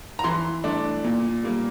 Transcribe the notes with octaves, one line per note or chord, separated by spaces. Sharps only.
A#5
E3 C6
A3 D4
A#2
G3 A#3